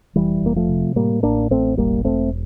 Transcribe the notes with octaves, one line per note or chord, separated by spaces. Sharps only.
F1 E3 G3
F1 A#3
F3 A3
C3
A2 G3 A#3
A1 A#3 D4
A1 A3 C4
E1 G3 A#3
E1 A3 C4